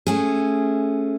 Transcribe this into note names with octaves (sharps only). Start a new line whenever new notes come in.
A3 C#4 G#4